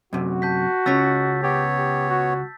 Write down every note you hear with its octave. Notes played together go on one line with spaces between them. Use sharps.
F#2 C3 F#4
A5 G6 B6
C#2 C#4 E6 A6 B6
B3 G4 C#5
G4
F#4